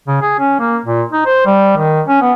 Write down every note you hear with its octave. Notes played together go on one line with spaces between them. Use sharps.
C#3
G#4
C#4
A#3
A#2
D#4
C5
G3
D#3
C#4
B3